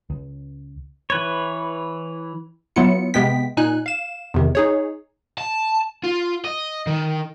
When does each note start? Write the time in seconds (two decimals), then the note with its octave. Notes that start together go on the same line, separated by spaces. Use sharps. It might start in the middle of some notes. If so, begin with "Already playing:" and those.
0.10 C#2
1.10 E3 B4 C#5
2.76 F#3 B3 E4 F4 C#7
3.14 C3 G#3 B3 G5 B6
3.57 A#2 D#4 G#5 F#6
3.86 F5 E7
4.34 E2 C3 D#3
4.55 D#4 G#4 C#5
5.38 A5
6.04 F4
6.45 D#5
6.87 D#3